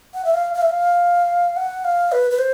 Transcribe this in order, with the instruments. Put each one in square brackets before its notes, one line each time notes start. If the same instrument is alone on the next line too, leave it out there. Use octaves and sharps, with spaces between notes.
[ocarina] F#5
E5
F5
F5
E5
F5
F#5
F5
B4
B4
C5